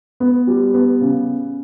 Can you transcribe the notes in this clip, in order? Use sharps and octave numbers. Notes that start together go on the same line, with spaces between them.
B3
G3
B3
C#3